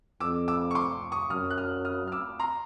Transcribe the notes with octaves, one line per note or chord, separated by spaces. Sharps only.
F2 D6 E6
D6 E6
C#6
C6 D6
C#6 D#6
F#2 D#6 F6
F#6
D#6 F6
D#6 F6
F6
D6 E6
A#5 C6